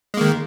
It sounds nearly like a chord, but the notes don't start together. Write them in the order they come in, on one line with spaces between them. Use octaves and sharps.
G#3 A#3 D#3